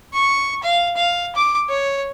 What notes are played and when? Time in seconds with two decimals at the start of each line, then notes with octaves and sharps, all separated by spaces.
0.13 C#6
0.63 F5
0.96 F5
1.35 D6
1.69 C#5